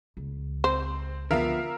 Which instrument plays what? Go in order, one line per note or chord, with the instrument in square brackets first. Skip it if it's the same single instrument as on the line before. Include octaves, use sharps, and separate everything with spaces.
[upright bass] C#2
[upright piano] C4 [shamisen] C5
[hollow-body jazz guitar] D3 F3 B3 [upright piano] A#4 E5 F5